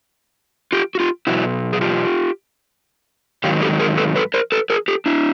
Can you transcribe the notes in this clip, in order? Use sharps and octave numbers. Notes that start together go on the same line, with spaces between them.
F4 G4
F#4
F4 G4
B2 F#3 E4 F#4
G#4
F4 G4
G#2 D#3 F#3 F4 G4
G4 A4
G#4 A#4
A4 B4
A4 B4
A#4 C5
A4 B4
G#4 A#4
G4 A4
D4 E4